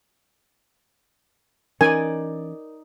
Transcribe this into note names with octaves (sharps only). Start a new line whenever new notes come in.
E3 C#4 D#4 A#4 D5 G#5